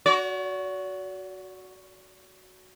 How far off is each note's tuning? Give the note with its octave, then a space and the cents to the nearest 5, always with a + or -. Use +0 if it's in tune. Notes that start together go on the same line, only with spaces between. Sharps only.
F#4 +0 D5 -45